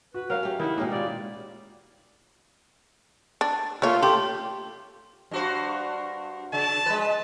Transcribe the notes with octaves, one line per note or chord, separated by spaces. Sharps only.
F#4 B4
F#3 C#4 A#4 F5 F6
A3 G4
D#3 E4 B4 F#5
B2 G#3 A#3 C#4 D#4 G4
A#2 F4 D5
D4
A3 A#3 F4 C#5
A3 G4 C6
G2 F#4 C5
C#3 A5
G#3 B4